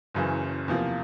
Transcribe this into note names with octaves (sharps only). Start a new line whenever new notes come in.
F#1 F#2 C#3 E3
E2 C3 F3 A#3